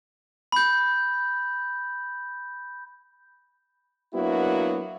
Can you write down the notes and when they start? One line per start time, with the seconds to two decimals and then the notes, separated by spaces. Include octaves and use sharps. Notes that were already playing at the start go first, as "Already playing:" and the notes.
0.52 B5 G6
4.14 F#3 A#3 B3 D4 E4 F#4